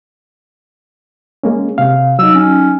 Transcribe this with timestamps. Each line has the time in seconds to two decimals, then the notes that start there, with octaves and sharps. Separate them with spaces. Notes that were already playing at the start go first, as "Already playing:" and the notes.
1.43 G#3 A#3 C#4
1.78 C3 F5
2.19 F#3 D#4 E6
2.35 C#4